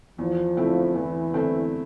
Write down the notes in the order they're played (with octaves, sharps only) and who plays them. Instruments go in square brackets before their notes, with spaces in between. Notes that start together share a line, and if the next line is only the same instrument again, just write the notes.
[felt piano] E2 [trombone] F3
[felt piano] D3 A3 C4 E4
[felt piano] E2 [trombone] E3
[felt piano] D3 A3 C4 E4